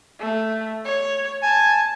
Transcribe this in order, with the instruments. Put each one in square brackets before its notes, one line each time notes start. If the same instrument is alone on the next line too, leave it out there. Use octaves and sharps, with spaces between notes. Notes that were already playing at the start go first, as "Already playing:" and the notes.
[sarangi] A3
C#5
[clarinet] G#5 [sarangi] A5